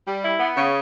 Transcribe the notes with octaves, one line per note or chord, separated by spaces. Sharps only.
G3
E4
B3
C#3